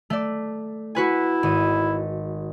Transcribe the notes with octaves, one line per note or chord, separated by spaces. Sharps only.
A3 D5
E4 F#4 B4 G#5
G#1 D#7